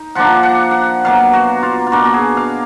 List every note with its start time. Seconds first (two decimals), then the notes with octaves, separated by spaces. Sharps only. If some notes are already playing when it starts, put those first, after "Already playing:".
Already playing: D#4
0.15 F3 A#3 D4 F#5
0.43 F#5
0.71 F#5
1.05 B2 F#3 A#3 F5
1.33 F#4
1.63 F4
1.87 F4
1.92 B2 A#3 D4 F#4
2.05 F#4
2.14 G#4
2.37 F5